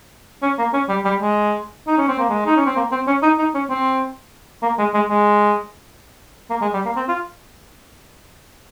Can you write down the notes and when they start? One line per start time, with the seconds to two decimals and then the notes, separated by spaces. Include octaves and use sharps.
0.42 C#4
0.58 A#3
0.73 C#4
0.89 G3
1.05 G3
1.20 G#3
1.87 D#4
1.97 C#4
2.08 C4
2.19 A#3
2.29 G#3
2.46 D#4
2.56 C#4
2.66 C4
2.76 A#3
2.91 C4
3.07 C#4
3.23 D#4
3.38 D#4
3.54 C#4
3.69 C4
4.62 A#3
4.78 G#3
4.94 G#3
5.10 G#3
6.50 A#3
6.61 G#3
6.73 G3
6.85 A#3
6.96 C4
7.08 F4